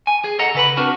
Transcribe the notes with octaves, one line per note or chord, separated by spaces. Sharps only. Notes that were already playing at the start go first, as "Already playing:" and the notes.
G#5
G#4
A4 D#5 F#5 A#5
C#3 B4 B5
C4 D4 F#4 A#4 B4